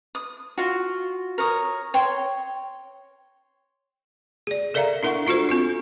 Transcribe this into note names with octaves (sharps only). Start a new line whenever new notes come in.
D#6
F4 F#4
A#4 C#5 D#6
C#5 G5 C6
G#4 D5
A4 A#4 D5 E5 F5 A#5
D4 E4 A#4 E5 F#5 C#6
D4 F4 F#4 A4 C5
C4 F4 F#4